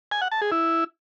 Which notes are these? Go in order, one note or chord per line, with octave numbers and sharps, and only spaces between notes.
G#5
F#5
A5
G#4
E4